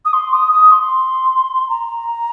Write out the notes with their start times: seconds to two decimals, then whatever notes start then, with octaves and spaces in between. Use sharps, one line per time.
0.05 D#6
0.13 C6
0.33 D#6
0.52 D#6
0.72 C6
1.69 A#5